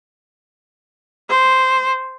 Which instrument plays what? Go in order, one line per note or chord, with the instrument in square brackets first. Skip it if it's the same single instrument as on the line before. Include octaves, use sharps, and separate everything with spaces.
[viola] C5